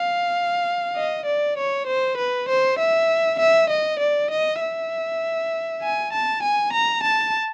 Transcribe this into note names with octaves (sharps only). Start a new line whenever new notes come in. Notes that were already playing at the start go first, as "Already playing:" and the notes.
Already playing: F5
D#5
D5
C#5
C5
B4
C5
E5
E5
D#5
D5
D#5
E5
G#5
A5
G#5
A#5
A5